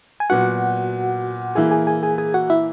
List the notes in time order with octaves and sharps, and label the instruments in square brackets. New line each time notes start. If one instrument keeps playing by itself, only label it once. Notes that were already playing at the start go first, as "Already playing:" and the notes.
[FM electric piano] G#5
[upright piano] A#2 F#3 B3 [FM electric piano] F#4 F#5
[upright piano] E3 A#3 E4 [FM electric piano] G#4 G#5
[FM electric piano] G#4 G#5
G#4 G#5
G#4 G#5
G#4 G#5
F#4 F#5
E4 E5